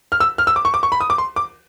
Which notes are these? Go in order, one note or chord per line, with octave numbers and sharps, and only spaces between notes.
F6
E6
F6
E6
D6
C#6
D6
C#6
B5
D#6
D6
C6
D6